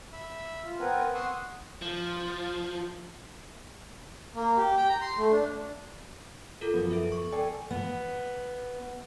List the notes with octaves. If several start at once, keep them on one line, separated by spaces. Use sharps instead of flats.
E5 B5 E6
F4
B3 C4 A#4 B4 F#5 G#5
F#5 C6 C#6 D#6 E6 F#6
F3
A#3
G4
G5
A#5
C6
A3
D4
F4 A4 A#4
F#2 F3 B3
A4 E5 D7
C#6
A4 D5 G5 G#5
B3